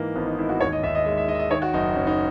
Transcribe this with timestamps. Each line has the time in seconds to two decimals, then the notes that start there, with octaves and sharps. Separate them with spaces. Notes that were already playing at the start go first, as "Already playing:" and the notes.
Already playing: G#2 E3 A#3
0.16 G#1 B3
0.26 D#4
0.38 G#2 E4
0.49 F#4
0.60 D#2 C#5
0.72 D#5
0.83 D#2 E5
0.95 D#5
1.05 G#3 E5
1.17 E5
1.27 D#3 D#5
1.34 E5
1.39 D#5
1.51 D#3 C#5
1.62 F#4
1.74 F#1 D#4
1.96 F#1 C#4
2.07 D#4